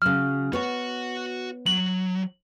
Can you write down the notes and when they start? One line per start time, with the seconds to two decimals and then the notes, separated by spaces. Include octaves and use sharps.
0.02 C#3 F#3 F6
0.53 B3 F#4 C#5 F#5
1.66 F#3 F#7